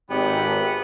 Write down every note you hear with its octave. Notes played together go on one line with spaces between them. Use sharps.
G#1 B3 G4